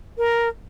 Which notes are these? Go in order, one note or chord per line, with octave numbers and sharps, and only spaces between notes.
A#4